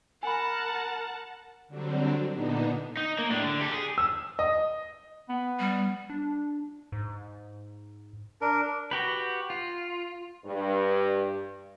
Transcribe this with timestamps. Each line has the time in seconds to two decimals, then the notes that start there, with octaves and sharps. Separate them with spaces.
0.23 A#4 F#5 G#5 A5 B5
1.68 D3 F#3 G3 C4 D4
2.31 A#2 D3 B3 D4 D#4
2.97 D#4
3.19 A#3
3.30 A2 D4
3.43 D3
3.61 G4 A4
3.74 G#4
3.98 E6
4.39 D#5
5.29 B3
5.60 G3
6.10 D4
6.92 G#2
8.42 D4 A#4
8.91 F#4 G4 B4
9.50 F4
10.45 G2